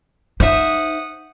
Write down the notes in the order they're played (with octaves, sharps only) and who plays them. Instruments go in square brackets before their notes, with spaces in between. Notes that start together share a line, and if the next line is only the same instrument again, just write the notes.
[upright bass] D#4 [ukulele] C5 E5 [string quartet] F#5 D#6